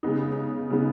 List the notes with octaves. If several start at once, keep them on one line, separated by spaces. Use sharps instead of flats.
C#3 G#3 B3 D#4
C#3 G#3 B3 D#4